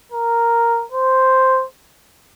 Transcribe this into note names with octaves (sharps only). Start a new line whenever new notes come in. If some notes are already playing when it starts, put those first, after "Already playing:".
A#4
C5